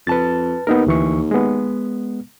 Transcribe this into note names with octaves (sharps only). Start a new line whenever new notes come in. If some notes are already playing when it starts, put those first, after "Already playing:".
F2 B4 A5 A6
D#2 B3 D#4 A#4
D2 E3 C#6
G#3 B3